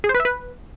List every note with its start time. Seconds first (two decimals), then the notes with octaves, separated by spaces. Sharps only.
0.04 G#4
0.09 C5
0.14 B4
0.20 E5
0.25 B4